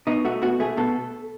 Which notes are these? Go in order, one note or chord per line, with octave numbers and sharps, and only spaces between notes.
B2 D#4
A3 F#4
B2 F#4
A3 G#4
B2 A4